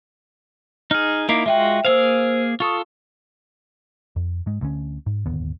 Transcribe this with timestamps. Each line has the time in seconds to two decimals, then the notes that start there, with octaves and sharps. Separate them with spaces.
0.91 D#4 G#4 F6
1.29 A#3 D#4 E4 D6 C7 D7
1.46 G#3 F4 F#4 E5 G5
1.85 A#3 G#4 C5 F5 E6
2.60 F4 A4 C#6 D#6
4.16 F2
4.46 G#2 G#3
4.61 D2 D3 C#4
5.06 G#2
5.26 D1 G1 D#2 B3